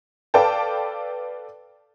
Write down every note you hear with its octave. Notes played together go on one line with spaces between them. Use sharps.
A4 B4 D5 F5 G5 A5